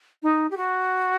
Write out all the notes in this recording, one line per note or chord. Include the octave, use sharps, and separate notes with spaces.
D#4
G4
F#4